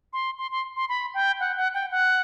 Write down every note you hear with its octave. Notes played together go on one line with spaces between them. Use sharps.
C6
C6
C6
C6
B5
G5
F#5
F#5
G5
F#5